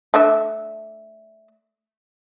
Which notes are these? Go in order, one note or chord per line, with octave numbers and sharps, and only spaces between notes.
A3 D4 E5